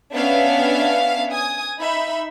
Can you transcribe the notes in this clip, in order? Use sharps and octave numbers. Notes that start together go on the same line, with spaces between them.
B3 C#4 D4 C#5 E5 F5
G#5 D#6
D#4 E5 B5